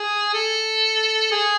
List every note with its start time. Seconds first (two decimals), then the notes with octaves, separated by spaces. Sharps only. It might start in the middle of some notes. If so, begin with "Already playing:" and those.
Already playing: G#4
0.34 A4
1.32 G#4